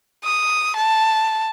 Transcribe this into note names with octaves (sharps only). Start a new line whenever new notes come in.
D#6
A5